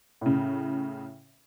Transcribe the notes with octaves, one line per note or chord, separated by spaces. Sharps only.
A2 C#3